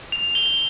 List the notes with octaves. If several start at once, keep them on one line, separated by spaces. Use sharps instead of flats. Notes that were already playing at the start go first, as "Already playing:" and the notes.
F7
G7